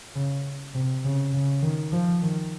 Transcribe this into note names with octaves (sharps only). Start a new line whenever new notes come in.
C#3
C3
C#3
C#3
D#3
F3
D#3